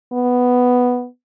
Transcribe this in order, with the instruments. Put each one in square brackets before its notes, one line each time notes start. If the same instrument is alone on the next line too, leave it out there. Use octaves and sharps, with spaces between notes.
[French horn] B3